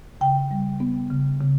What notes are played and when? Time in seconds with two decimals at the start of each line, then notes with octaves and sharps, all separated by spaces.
0.21 C#3 G5
0.51 G3
0.80 B3
1.10 C#3
1.40 C#3